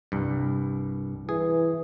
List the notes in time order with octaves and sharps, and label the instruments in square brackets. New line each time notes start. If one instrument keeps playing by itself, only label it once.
[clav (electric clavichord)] C2 G2
[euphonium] E3 [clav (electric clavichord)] G#4